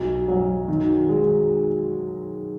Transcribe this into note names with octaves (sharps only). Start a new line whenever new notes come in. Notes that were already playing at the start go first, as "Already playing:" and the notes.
Already playing: B1
F#3
D#3
G#3